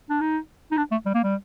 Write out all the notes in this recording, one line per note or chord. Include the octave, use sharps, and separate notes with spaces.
D4
D#4
D#4
D4
A3
G3
A#3
G3